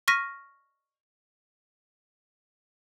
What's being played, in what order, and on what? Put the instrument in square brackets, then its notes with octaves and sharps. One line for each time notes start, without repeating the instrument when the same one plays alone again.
[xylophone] C#6 F6 A#6 B6 D#7